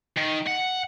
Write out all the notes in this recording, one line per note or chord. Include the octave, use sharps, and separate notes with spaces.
D#3
F#5